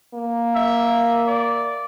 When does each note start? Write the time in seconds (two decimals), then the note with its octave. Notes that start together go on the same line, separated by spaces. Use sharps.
0.14 A#3
0.55 E5
1.27 D5